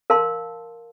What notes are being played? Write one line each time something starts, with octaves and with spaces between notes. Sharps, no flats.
A#4 F5 A5 C6